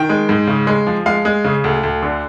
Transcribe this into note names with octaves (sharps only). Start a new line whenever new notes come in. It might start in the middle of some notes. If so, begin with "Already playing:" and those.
Already playing: D#3 G5
G#3
G#2
C#3
G#3
F3
G#3 F5
G#3
C#3
D2
D2
D3